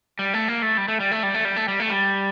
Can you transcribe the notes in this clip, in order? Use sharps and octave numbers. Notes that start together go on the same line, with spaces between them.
G3
A3
A#3
A3
G3
A3
G3
A3
G3
A3
G3
A3
G3
A3
G3